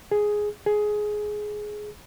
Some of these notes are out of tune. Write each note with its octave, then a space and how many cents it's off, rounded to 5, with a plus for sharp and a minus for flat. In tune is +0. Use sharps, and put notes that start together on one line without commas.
G#4 +5
G#4 +15